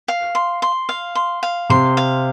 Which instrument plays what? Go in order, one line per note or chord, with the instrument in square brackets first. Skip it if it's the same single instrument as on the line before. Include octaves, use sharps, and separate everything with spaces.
[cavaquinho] F5
C6
C6
F5
C6
F5
[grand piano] C3 [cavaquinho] C6
[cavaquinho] F5